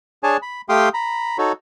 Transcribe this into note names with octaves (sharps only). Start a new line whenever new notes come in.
D4 G#4 C#5 G#5 A5
B5
A3 G4 F5 G5 C6 D#6
A#5 B5
D#4 F#4 A4 C#5